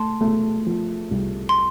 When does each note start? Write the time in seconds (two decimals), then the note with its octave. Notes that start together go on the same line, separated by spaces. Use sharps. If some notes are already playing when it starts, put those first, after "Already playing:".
Already playing: A3 A5 C6
0.21 A3
0.66 F3
1.11 C2
1.49 C6